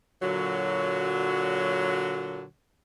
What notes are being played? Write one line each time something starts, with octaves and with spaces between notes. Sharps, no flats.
A#2 D3 F#3